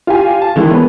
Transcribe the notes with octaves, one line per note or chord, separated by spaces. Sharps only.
F4 G4 G#5
A5
D#3 E3 G#3
B3 B4